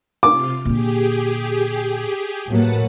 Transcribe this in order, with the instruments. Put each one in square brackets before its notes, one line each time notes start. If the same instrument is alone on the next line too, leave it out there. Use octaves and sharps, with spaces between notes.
[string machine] C3 F4 [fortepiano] D6
[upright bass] A#2 D3 [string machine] G4 G#4
[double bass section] A2 F#3 A#3 [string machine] B4 F#5 A5